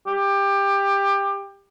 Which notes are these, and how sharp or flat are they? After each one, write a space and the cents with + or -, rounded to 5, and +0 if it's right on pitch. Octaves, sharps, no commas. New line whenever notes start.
G4 +20